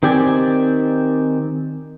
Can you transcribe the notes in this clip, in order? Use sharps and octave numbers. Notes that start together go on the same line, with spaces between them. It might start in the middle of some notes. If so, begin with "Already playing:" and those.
D#3 C4 G4 D5 G#5